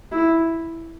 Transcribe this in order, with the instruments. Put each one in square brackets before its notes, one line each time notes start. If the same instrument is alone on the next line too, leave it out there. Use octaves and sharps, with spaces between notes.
[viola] E4